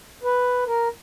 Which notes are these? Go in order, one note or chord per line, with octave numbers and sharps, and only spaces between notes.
B4
A#4